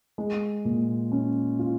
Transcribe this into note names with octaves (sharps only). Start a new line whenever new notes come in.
G#3
A#2
C#4
F4